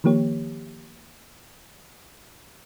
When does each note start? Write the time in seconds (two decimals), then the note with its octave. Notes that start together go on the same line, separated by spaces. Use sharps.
0.04 D#3 F3 A#3 G4 C#5